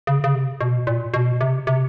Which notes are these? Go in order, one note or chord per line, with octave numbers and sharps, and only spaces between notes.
C#3
C#3
C3
B2
A#2
B2
C3
C3